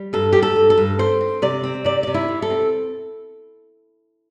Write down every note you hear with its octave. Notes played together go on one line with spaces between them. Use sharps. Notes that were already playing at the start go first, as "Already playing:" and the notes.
Already playing: G3
G2 A4
G2 G4
A4
G2
A4
G2
C4 C5
C4
C3 D5
C4
C3 D5
C3 D5
E4
C3
A4
C4